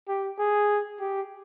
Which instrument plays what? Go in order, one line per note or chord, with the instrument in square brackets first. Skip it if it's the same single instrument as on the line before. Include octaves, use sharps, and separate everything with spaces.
[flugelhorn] G4
G#4
G4